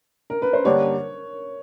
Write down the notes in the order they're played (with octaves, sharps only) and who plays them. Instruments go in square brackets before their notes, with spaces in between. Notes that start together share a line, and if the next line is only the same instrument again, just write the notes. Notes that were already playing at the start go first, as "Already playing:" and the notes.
[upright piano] A#4
B4
C5
[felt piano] G2 D3 G3 A#3 D4 [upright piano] C#5